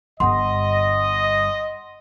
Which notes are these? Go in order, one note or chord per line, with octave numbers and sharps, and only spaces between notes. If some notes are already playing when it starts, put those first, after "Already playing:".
G1 G2 D#5 F#5 C6